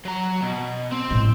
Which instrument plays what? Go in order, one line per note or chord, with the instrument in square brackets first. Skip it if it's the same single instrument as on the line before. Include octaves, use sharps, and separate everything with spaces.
[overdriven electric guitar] F#3 A#5
B2
C4
[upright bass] A2 G#3